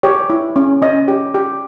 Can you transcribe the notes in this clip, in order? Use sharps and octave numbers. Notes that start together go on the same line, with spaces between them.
G4 C#5
E4
C#4
C#4 D#5
G4
G4